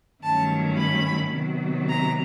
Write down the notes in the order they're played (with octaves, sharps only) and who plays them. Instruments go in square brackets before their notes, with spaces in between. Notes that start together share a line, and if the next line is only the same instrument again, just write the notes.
[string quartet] G2 D#3 F#3 A3 C#4 A5
B5
C3 D#3 F#3 B3
A#5